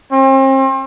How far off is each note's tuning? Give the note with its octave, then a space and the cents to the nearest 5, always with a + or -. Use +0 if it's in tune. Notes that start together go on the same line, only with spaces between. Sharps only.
C4 +40